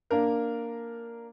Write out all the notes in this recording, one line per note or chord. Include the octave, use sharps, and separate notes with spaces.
A#3 D4 A#4